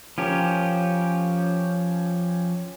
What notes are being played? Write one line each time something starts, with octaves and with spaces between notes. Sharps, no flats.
F3 C#4 G4 A#4